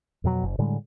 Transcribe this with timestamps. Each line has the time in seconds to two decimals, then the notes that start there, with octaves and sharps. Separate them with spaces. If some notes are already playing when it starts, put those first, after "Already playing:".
0.24 F2 B2 F#3
0.44 F#1
0.59 A2 D3 G3 G#3